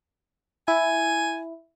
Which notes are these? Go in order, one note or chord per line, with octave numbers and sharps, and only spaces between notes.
E4 G#5